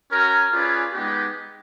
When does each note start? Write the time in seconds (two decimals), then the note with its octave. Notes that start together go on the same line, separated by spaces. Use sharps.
0.11 C#4 F#4 A#4
0.52 C#4 F4 G#4 B4 D5
0.93 G#3 B3 D#4 G4